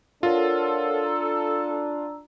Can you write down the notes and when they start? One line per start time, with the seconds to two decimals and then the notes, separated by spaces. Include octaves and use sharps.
0.23 D4 F4 A4 A#4 C#5 F#5
1.05 A#5 E6